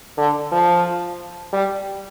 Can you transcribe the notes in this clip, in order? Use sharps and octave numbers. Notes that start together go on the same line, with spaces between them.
D3
F3
G3